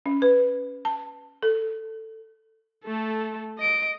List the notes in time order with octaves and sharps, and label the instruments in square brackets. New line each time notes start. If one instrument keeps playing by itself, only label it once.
[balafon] C#4
B4
A5
A4
[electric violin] A3 A4
D#5 D7